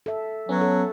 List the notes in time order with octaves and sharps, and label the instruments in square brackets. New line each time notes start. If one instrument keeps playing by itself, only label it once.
[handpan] A4 E5
[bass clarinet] F#3 [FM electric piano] B3 C#4
[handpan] A4